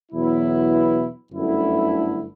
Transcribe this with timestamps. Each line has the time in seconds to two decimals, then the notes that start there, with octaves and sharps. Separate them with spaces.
0.12 E2 B2 F#3 B3 E4
1.31 G1 F#2 D3 A3 E4